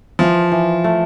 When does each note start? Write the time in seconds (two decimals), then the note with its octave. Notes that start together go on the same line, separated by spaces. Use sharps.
0.19 E3 F3
0.52 E3
0.84 A3